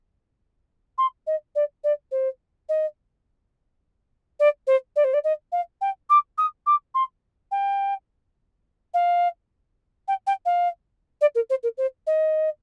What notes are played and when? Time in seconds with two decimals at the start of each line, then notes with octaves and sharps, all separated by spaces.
0.98 C6
1.27 D#5
1.55 D5
1.84 D5
2.11 C5
2.69 D#5
4.39 D5
4.67 C5
4.96 D5
5.04 C5
5.13 D5
5.24 D#5
5.52 F5
5.81 G5
6.10 D6
6.38 D#6
6.66 D6
6.94 C6
7.51 G5
8.94 F5
10.08 G5
10.27 G5
10.45 F5
11.21 D5
11.35 A#4
11.50 C5
11.63 A#4
11.77 C5
12.07 D#5